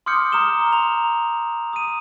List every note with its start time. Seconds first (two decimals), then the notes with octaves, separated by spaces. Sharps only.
0.06 C6 D6 D#6 F6 G6 C#7
0.32 A#5 D#6 F6 E7 G7
0.72 A#5 C6 F7
1.73 D#6 D#7